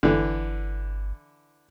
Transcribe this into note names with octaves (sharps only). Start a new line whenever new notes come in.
G1 D3 E3